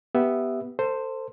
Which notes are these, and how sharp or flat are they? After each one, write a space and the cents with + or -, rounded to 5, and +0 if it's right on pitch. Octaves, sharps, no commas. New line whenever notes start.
B3 +0 G4 +0 E5 +0
A4 +35 C5 +0